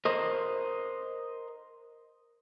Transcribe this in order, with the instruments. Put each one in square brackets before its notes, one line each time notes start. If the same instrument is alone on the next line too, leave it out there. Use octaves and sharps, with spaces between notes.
[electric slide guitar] A#4 C5 D#5